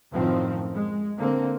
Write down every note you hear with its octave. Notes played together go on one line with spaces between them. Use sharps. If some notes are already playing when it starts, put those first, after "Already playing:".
F#2 A2 D#3 F3 C4
G#3
D3 A#3 C4